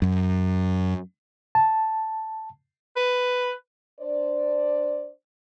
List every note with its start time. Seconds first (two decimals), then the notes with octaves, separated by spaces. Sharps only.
0.02 F#2
1.55 A5
2.97 B4
4.00 D4 C5 D5